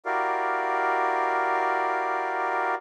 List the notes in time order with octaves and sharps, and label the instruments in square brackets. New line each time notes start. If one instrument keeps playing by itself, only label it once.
[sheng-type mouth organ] E4 F#4 G4 A#4 D5 F5